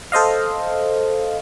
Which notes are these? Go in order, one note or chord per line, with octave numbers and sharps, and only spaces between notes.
A4 C5 D#5 F5